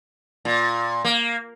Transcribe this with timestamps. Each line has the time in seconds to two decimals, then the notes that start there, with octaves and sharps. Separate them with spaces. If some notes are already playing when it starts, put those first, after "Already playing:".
0.45 A#2
1.05 A#3